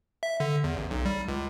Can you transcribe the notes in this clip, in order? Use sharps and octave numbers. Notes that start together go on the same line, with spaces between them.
E5
D3
E2
A1
B1
G3
C#2